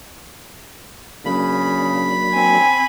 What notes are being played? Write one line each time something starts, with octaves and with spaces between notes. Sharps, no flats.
C#3 F#3 A#3 D4 B5
C4 G#5